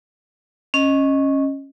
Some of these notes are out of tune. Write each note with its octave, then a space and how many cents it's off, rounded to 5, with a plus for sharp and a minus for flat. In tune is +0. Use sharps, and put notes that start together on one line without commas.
C#4 -15 D#5 +0